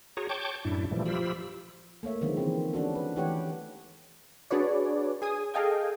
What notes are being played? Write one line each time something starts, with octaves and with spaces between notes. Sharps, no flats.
F#4 G#4 C#5 A#5
C#5 G5 A5 C#6 D6 G6
F#2 A2 D4 E4
A#2 E3 F3 G3 A3
F3 F4 G4 B5 E6
A3 A#3 C#5 E5
D3 D#3 F3 G#3 B3
D#3 E3 C4
C#4 D4 F#4 A4
B4
E3 A3 G4 C#5 F#5
D4 F#4 G#4 B4 C#5 D5
G#4 G#5 D#6
G#4 A4 D#5 F5 G5 G#5